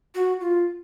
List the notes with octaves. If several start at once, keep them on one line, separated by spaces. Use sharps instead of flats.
F#4
F4